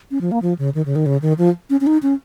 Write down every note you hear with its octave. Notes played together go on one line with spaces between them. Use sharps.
C#4
F3
A#3
F3
C#3
D#3
C#3
D#3
C#3
D#3
F3
C#4
C#4
D#4
C#4